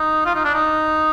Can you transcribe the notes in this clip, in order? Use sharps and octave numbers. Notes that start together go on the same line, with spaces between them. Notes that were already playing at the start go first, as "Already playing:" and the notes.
Already playing: D#4
F4
D#4
D4
D#4